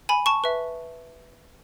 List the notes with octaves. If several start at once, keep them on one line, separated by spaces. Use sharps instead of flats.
G#5 B5
A5 C#6
B4 E5